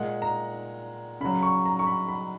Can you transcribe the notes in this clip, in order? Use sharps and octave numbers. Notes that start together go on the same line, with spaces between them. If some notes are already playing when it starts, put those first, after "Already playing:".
Already playing: A#2 G#3 F#5
A#5
C#3 F#3 B5
C#6
A#5
C#6
B5
B5